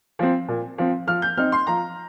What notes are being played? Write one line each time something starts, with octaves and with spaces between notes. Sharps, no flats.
F3 C4
A#2
F3 C4
F3 F6
G6
C4 D#4 F6
C6
F3 A#5